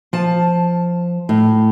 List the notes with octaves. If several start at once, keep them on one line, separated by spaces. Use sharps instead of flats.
F3 A5
A2